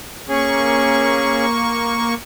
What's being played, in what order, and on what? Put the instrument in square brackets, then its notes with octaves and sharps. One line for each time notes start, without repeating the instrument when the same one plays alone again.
[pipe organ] A#3 C#6 [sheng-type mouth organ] C#4 G#4